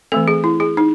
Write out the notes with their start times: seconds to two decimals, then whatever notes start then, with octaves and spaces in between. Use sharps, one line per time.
0.12 E3 A3 C4 A4
0.28 G#4
0.44 E4
0.60 G#4
0.77 D#4